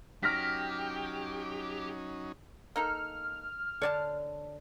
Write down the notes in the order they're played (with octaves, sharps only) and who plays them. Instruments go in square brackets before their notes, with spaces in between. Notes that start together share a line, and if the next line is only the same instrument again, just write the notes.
[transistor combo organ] F#3 C#4 D#4 [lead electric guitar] G4 [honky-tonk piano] F6 A#6 B6
[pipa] A#3 D#4 A4 [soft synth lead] F6
[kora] D3 [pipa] C#5 D5 A5